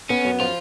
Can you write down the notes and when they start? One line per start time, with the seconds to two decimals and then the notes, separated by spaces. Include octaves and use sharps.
0.09 B3 C#4
0.25 F#2
0.40 F3 F4